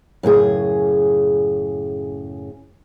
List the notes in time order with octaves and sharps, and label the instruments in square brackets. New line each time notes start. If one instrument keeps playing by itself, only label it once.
[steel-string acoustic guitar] F#2 A2 C#3 G#4